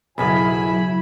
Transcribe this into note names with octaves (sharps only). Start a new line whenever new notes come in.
B1 F#2 C#3 F#3 E4 G#5 B5